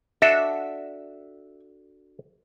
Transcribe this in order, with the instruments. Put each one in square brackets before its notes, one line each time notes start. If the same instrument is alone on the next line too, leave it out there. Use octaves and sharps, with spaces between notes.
[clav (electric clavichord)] D4 F#4 A4 [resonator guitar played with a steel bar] E5